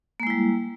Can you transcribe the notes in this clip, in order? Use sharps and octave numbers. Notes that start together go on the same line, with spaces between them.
G3 G#3 A#3 E4